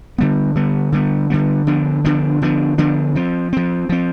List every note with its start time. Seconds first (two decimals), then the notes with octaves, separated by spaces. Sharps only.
0.18 D3 G3 B3
0.55 D3 G3 B3
0.92 D3 G3 B3
1.30 D3 G3 B3
1.67 D3 F3 B3 D4
2.05 D3 F3 B3 D4
2.42 D3 F3 B3 D4
2.78 D3 F3 B3 D4
3.15 F3 C4
3.53 F3 C4
3.89 F3 C4